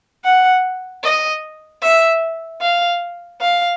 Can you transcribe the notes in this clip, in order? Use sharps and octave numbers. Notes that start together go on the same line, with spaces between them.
F#5
D#5
E5
F5
F5